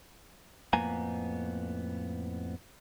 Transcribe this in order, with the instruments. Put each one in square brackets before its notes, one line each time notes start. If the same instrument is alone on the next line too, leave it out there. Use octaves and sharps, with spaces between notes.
[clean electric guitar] F2 A2 A#3 B3 G#5 A#5